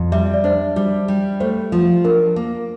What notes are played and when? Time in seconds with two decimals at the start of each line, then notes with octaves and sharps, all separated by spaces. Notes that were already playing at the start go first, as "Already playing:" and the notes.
Already playing: F2
0.12 G3 E5
0.34 D5
0.44 D4 C5
0.76 G3
1.08 G3
1.40 A3 C5
1.72 F3
2.05 D4 A#4
2.36 A#3